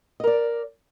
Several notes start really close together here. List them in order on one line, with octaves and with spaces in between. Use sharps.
D#5 A#4 D5